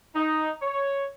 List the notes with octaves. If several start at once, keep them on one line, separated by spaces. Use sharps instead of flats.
D#4
C#5